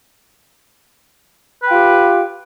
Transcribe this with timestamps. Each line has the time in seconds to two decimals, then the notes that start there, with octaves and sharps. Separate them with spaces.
1.62 B4
1.66 G5
1.70 F4
1.73 G4